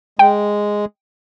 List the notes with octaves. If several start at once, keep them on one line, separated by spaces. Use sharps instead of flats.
G#3 G5